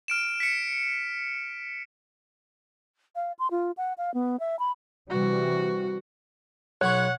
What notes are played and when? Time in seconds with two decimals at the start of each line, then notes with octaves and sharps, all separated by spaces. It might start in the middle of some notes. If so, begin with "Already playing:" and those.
0.08 F6 D7 E7
0.40 B6 C#7
3.16 F5
3.39 C6
3.51 F4
3.77 F#5
3.98 F5
4.14 B3
4.40 E5
4.59 B5
5.10 C3 E3 G3 F#4
6.81 B1 B4 C#5 F#5 C#6 F#6